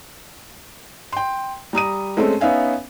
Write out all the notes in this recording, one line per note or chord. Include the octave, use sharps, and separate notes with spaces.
G5 C6
G3 A#5 D#6 D#7
G#3 A3 C4 C#4 A4
B3 C#4 D#4 E5 F5 G#5